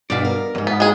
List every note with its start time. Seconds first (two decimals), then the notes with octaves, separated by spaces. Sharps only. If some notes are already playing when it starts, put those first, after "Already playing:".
0.10 G2 B2 F#4 D5 F5
0.25 A#4
0.55 E2 G#2
0.67 B3
0.80 G#3 G#4